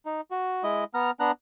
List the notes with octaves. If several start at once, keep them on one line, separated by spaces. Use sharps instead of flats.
D#4
F#4
G#3 E4 D#5
B3 A#5 F6
B3 D4 A#5 F#6